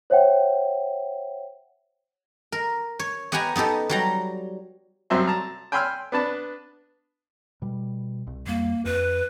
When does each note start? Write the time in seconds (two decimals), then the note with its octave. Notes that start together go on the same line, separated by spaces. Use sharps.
0.10 C5 C#5 E5 F#5 G5
2.52 A#4
2.99 C#5
3.32 B3 G4 F#5 G#5 A#5
3.56 B3 D#4 G4 A4
3.89 F#3 G3 A#5
5.10 C2 F#2 F#3 C4 E5 C6
5.27 A5 A#5
5.72 G5 G#5 B5 C6 E6 F6
6.12 B3 D4 B4 A5
7.62 B2 G3
8.27 C2
8.47 F2 G3 A#3
8.85 F2 B4